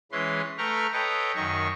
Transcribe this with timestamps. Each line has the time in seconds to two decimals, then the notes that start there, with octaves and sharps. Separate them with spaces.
0.12 E3 G#3 C#4 B4 C6
0.58 A3 B4 G5 A#5 C#6 F6
0.93 A4 B4 C#5 D#5 G5 A#5
1.36 F#2 D#3 D#5 C#6